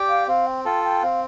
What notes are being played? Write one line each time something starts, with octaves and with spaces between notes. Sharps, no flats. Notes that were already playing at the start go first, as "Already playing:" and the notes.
Already playing: G4 D5 G5
F5
C4 F5
G5
F4 A4 G5
G5
C4 F5